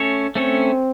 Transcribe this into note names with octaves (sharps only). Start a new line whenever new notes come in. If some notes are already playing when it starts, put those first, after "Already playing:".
Already playing: A3 C#4 A4 C#5
A3 C4 C#4 A4 C#5